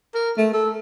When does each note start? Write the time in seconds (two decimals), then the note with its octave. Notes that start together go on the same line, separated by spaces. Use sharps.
0.14 A#4
0.37 A3
0.54 A4